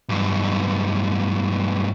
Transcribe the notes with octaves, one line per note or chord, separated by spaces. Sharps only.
B1 G2